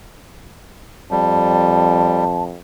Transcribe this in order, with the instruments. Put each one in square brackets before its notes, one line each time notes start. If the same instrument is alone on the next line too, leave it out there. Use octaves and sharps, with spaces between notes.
[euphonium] F2 [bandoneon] G3 [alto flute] A5